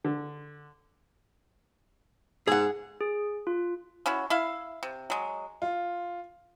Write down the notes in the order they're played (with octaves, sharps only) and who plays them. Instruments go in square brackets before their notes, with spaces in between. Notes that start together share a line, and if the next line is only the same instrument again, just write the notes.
[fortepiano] D3
[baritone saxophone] G#2 [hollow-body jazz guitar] G#4 F#5
[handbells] G#4
F4
[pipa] C#4 E4 F#4
E4 E5 F5
C3
F#3 G#3
[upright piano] F4